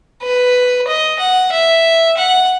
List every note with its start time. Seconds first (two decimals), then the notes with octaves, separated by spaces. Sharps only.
0.22 B4
0.88 D#5
1.19 F#5
1.52 E5
2.17 F#5